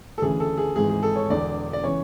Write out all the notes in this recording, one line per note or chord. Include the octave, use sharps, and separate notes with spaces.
A4
D2 C#3 E3 G#4
A4
G#4
G#1 G#2 E3 G#4
G#4
A4
C#5
E1 E2 D3 D5
D5
C#3 E3 C#5